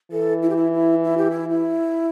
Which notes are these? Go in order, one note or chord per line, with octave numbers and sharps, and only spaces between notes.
E3 A4
E4
G4
E4
E4
E4
G4
E4
E4